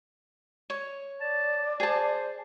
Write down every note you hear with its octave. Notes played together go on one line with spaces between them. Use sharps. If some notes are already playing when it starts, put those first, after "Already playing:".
C#5
D5 A5
G#4 C5 A5